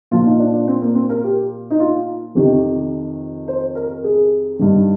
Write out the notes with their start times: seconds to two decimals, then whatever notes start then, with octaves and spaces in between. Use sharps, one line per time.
0.11 A#2 F3 F4
0.26 D#4
0.40 D4
0.53 D4
0.68 C4
0.82 A#3
0.95 C4
1.09 A#4
1.24 G4
1.71 D#4
1.80 F4
2.35 F2 C3 D#3 G4
3.48 C5
3.75 A#4
4.04 G#4
4.59 G2 D#3